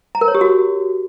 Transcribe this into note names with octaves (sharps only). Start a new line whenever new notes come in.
A#5
A#4
C#5
G4
F#4